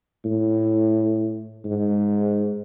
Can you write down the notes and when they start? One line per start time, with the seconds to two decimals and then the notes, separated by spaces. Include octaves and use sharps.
0.25 A2
1.65 G#2